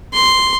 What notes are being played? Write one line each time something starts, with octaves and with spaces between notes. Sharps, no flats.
C6